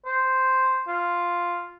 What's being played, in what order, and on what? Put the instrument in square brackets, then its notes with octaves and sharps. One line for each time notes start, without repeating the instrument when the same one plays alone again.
[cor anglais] C5
F4